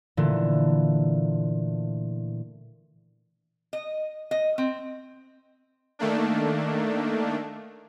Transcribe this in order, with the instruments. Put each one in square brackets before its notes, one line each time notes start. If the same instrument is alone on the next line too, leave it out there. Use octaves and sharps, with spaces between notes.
[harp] A#2 D3 E3 A3
[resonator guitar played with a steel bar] D#5
D#5
C4
[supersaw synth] D#3 A3 A#3 D4